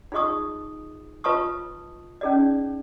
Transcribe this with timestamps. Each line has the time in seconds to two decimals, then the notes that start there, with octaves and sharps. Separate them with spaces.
0.12 D#4 F4 G#4 D#5 C#6 D#6
1.24 F4 B4 D#5 A5 C#6 D#6
2.21 C#4 D#4 G#4 D5 D#5